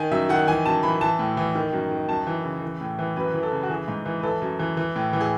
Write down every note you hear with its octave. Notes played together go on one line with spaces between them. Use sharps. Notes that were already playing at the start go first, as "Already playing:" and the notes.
Already playing: D#3 G#5
F#2 E5
D#3 F#5
E3 G#5
F#2 A5
E3 B5
E3 A5
A2
E3
D#3
F#2
D#3
F#2 A5
E3
C#3
E3
A2
E3
F#2 B4
E3
A4
C#3
F#4
E3 G#4
G#2
E3
B4
E3 A4
F#2
E3
E3
A2
E3
G#4